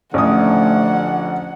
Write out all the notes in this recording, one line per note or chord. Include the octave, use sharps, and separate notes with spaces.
A1 D3 F3 A3 F#5 D#6